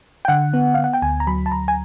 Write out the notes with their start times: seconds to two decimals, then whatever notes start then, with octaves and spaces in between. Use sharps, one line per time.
0.25 G5
0.28 D3 F#5
0.54 B3
0.74 B3 F5
0.84 F#5
0.93 G5
1.02 D2 G#5
1.20 A#5
1.27 F#3 B5
1.46 A5
1.51 D2 A#5
1.68 G#5